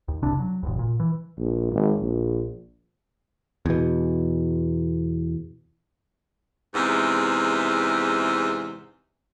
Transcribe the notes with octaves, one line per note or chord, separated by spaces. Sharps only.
D#2
F#1 C2 C3 D4
F#3
E1 A1 D#2
A#2
E3
A#1
G#1
A#1
E2 B2
E2 G#2 C3